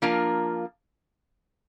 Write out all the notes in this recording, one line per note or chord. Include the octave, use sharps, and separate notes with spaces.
F3 A#3 D4 F4 A#4